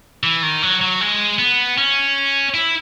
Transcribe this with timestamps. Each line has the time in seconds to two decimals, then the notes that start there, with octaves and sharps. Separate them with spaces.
0.23 E3
0.43 D#3
0.63 F#3
0.81 F#3
1.01 G#3
1.39 B3
1.78 C#4
2.54 E4